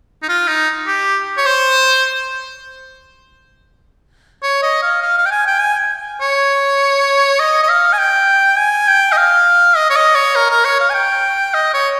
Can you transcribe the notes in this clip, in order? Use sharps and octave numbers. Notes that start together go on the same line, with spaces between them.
D#4
F4
D#4
G4
C#5
C5
C#5
D#5
F5
F5
F5
G5
G#5
G5
G#5
C#5
D#5
D#5
F5
G#5
G5
G#5
G5
D#5
F5
D#5
C#5
D#5
C#5
A#4
A#4
C#5
F5
G#5
G5
D#5
C#5